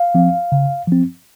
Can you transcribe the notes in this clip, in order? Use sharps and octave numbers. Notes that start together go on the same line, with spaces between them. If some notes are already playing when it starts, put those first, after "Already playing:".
Already playing: F5
F3 C4
C#3
F3 C4